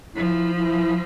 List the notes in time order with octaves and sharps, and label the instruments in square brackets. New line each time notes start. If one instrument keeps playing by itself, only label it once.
[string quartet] F3 [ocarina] E4
[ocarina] E4